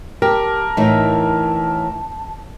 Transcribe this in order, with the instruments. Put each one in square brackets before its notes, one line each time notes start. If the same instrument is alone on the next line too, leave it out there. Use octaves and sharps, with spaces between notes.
[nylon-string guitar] G4 [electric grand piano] A#4 [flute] A5
[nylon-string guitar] A2 E3 D#4